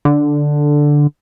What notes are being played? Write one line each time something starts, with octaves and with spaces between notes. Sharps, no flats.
D3